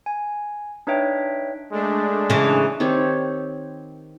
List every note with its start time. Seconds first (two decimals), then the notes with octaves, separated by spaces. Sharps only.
0.06 G#5
0.87 D4 D#4 B4 C#5 E5 G5
1.72 G#3 A3 D4
2.30 C#3 E3
2.80 D#3 C4 G4 C#5